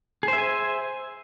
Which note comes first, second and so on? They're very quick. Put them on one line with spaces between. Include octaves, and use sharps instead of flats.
G#4 C5 E5 G#5